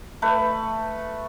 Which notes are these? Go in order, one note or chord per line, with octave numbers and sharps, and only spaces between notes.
A3 B4